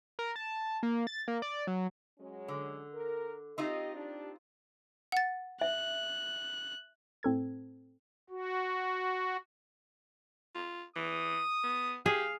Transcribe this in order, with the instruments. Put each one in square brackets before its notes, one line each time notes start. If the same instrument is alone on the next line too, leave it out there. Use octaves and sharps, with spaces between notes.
[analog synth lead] A#4
A5
A#3
A6
A#3
D5
F#3
[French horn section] F#3 G#3 C#4
[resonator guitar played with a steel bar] D3
[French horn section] A#4
[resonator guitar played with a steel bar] C4 D#4 F4 [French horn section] G4 D#5
[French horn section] D4 G4
[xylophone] F#5 A6
[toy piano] E5 [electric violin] F#6
[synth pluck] A2 C4 A4 G#6
[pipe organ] F#4
[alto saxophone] F4
[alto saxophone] E3 [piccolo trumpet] D#6
[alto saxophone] B3
[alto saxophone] G4 [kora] G#4 [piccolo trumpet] F5